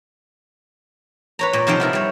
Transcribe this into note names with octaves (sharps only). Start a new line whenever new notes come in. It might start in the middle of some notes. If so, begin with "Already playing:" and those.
B4 C#5 A#5
A#2
C3 F3 D#4 C5 G5
B3 E4 A#4
G3 C#5